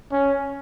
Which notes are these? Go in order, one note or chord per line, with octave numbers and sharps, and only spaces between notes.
C#4